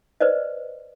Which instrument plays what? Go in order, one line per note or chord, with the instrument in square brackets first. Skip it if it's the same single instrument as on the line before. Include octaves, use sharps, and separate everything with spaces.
[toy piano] B4 C5 D5 D#5